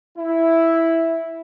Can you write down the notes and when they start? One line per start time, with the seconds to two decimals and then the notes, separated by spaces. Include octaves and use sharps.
0.18 E4